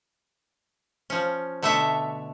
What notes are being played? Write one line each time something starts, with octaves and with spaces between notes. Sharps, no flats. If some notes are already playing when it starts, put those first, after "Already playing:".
F3 C#4
B2 D3 A3 C#5 E5